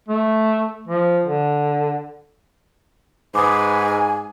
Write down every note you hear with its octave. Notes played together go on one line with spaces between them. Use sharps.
A3
F3
D3
G#2 B4 G#5 D6 D#6